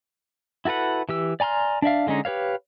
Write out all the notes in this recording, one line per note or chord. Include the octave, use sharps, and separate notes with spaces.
E4 F#4 A4 B4 F#5
E3 G4 E6
D5 G#5 A#5 C6 F6
D4 D5 E5 F5
D3 G#3 C#4 D#4
G4 B4 C#5 F5